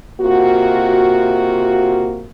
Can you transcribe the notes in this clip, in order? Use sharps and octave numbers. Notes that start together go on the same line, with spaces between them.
C3 A#3 F4 F#4